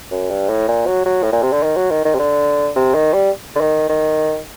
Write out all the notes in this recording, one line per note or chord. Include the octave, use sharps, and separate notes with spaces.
F#2
G2
A2
A#2
F#3
F#3
A2
A#2
C3
D3
D#3
F#3
D#3
D#3
C3
D3
C3
D#3
G3
D3
D#3
D#3